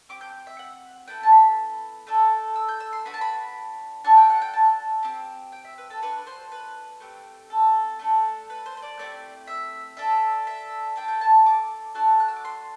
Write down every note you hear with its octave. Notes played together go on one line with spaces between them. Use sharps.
C4 G4 D6
G6
E5
F#5
B3 E4 A4 G5
A5
B5
A3 D4 A4
E6
G6
E6
C6
B3 D4 F#4 B5
A5
B5
D4 F#4 A4 A5
G5
F#5
G5
A5
C4 G4
G5
E5
B4
A4
D4 F#4 A4 B4
C5
B4
A3 C4 G4
A4
A3 D4 A4
B4
C5
C5
D5
A3 C4 E4 G4 D5
E5
D4 A4 E5
E5
D4 A4 G5
G5
A5
D6
D4 F#4 A4
F#6
E6
D6
C6